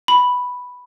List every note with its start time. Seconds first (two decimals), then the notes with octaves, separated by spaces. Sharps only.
0.08 B5